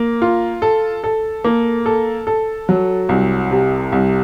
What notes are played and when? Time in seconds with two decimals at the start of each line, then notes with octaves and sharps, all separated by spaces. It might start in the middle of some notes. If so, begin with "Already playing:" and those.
Already playing: A#3
0.22 F4
0.62 A4
1.04 A4
1.44 A#3
1.86 A4
2.27 A4
2.69 F#3
3.09 C2
3.51 C3
3.92 C2